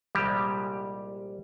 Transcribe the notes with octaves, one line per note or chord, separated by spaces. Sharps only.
C2 A#2 F3 G3 G#3 G4